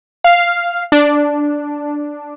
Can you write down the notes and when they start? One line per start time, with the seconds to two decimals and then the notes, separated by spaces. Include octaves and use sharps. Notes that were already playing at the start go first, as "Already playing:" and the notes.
0.24 F5
0.92 D4